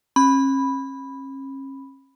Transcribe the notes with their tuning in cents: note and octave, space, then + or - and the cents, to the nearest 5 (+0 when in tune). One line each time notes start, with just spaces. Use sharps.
C#4 -40 B5 +0